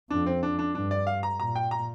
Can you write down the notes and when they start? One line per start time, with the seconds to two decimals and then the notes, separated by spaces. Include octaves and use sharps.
0.10 F2 D4
0.26 C4
0.43 D4
0.59 D4
0.75 G2 D4
0.91 D5
1.07 F5
1.23 A#5
1.39 A#2 A#5
1.55 G5
1.71 A#5